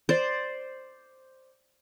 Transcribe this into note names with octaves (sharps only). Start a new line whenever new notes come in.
C5 D5